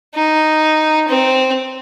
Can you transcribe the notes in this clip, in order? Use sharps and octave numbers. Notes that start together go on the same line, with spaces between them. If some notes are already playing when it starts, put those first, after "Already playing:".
D#4
C4